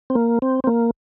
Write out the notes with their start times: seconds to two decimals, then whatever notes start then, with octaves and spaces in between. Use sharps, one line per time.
0.10 C4
0.15 A#3
0.42 C4
0.64 C4
0.67 A#3